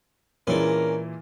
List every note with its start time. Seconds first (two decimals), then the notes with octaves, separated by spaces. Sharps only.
0.47 A#2 E3 G#3 C#4 D4 A#4